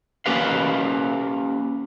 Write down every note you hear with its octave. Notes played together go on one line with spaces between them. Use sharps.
A#3 C#4 G4 A#4 B4 F5